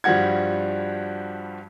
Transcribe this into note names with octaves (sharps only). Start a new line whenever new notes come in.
G2 F3 G3 F#4 F#5 G#6